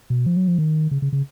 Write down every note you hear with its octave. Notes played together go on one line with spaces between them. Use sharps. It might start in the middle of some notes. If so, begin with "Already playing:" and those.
B2
F3
F#3
F3
D#3
C#3
C#3
C#3